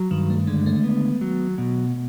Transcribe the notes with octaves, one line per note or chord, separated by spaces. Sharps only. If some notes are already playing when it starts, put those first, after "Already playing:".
Already playing: F#3
G2 D#3
A3
D3 G#3
A3
B3
F#3
B2